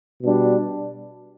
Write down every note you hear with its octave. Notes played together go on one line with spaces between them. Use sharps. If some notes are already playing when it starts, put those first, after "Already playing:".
B2 G3 D4